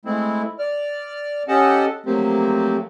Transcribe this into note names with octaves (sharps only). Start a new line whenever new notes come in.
G#3 A3 C4 E4
D5 F6
C#4 G4 A4 D#5 F#5 A5
F3 F#3 A3 A#3 C4 G4